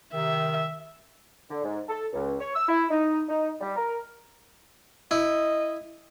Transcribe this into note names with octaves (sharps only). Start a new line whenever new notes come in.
C3 D#3 E5
D3
G#2
A4
C#2
C#5
E6
E4
D#4
D#4
G3
A#4
E4 D#5